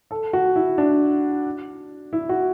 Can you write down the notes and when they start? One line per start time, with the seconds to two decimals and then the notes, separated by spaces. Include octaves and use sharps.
0.11 A4
0.33 F#4
0.56 E4
0.78 D4
2.13 E4
2.29 F#4